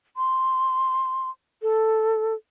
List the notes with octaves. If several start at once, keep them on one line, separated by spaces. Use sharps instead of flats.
C6
A4